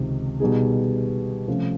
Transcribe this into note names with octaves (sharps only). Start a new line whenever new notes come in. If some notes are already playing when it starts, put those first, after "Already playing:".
Already playing: C#2 C3 D#3
B2 G3 B3 D#4 G#4
C3 F3 A3 C#4